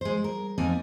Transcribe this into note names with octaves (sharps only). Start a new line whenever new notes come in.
G#3 C5
A#4
F2 A#3 C4 D#4 D5 G#5